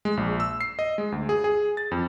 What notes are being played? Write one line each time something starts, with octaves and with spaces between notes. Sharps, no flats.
G#3
A#1
E6
C7
D#5
G#3
D2
G#4
G#4
A6
F2